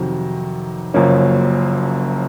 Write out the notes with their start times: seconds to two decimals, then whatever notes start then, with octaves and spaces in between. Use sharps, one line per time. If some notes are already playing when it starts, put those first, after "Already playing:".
Already playing: F2 C3 D#3 F#3
0.94 F#1 F#2 F3 A#3 C#4